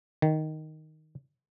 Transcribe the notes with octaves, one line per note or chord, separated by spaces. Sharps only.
D#3